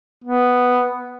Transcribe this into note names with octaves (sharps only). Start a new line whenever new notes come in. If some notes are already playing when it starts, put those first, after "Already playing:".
B3